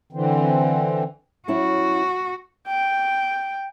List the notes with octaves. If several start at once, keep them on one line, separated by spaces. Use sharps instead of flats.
D3 E3 C4
F#3 C#4 E4 F#4
G5